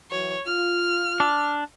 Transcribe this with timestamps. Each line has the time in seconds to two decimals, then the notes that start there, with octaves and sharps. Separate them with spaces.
0.11 E3 F#3 C#5
0.46 F4 F6
1.20 D4